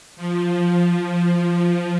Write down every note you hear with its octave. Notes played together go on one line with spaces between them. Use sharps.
F3